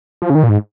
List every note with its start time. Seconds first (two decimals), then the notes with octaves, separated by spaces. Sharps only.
0.22 F3
0.30 C#3
0.35 D#3
0.43 A#2
0.49 G#2